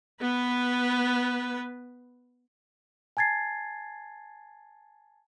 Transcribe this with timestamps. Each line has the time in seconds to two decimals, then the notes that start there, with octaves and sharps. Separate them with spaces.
0.21 B3 B4
3.17 G#5 A5 G#6 A6 C7